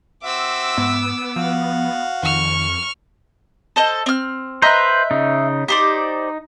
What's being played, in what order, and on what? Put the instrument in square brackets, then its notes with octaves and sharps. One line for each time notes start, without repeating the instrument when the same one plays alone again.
[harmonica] C4 F#4 E5 [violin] D6 E6
[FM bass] G#2 [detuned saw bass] B3
[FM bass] F3 [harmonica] F#4 F5
[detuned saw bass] F2 [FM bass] D#3 [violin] C#6 F6
[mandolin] A4 C5 D#5
C4 F6
[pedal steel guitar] B4 C5 [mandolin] D#5 E5 A#5
[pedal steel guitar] C#3 D#4
[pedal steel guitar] D#4 [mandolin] G4 C5 D5